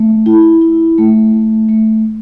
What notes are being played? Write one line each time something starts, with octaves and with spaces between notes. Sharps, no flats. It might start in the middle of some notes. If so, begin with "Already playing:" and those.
Already playing: A3
E4
E4
A3
A3
A3